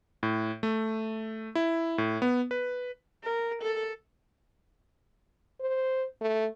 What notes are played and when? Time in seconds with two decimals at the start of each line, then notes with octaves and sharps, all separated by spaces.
0.23 A2
0.63 A3
1.55 E4
1.98 A2
2.22 B3
2.51 B4
3.24 A#4
3.62 A4
5.60 C5
6.21 A3